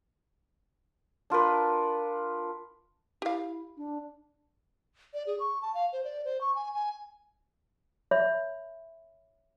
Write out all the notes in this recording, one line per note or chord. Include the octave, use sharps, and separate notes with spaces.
D4 F4 A#4 B4
E4 G4 F5
D4
D5
G#4
C#6
A5
F5
C5
D5
C5
C#6
G#5
G#5
C#5 E5 B5